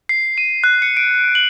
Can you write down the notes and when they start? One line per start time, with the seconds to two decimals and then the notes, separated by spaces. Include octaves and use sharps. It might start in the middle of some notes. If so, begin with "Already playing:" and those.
0.09 C7
0.38 D#7
0.64 F#6
0.82 C#7
0.97 D7
1.35 F#7